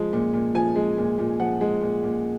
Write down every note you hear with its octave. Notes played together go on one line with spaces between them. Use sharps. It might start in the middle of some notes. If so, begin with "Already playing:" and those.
Already playing: F3 G#3
A#2
A#2
F3 G#5
G#3
A#2
A#2
F3 F#5
G#3
A#2
A#2